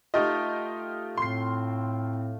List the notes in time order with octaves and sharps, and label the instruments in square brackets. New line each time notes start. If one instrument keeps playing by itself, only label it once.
[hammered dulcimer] A3 F4 [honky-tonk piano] D#4 G4 D#5
[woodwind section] A2 C4 [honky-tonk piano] C6 C7